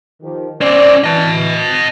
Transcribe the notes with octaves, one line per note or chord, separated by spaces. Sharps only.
D#3 F3 G4
C#4 C5 D5
E3 D#5 A5